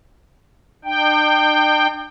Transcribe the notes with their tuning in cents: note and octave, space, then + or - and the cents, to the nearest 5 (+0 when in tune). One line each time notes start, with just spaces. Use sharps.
D4 +45 G5 +0